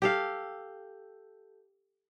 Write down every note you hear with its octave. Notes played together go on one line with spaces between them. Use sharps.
G4 A4 F5